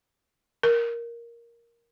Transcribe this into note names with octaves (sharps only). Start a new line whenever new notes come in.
A#4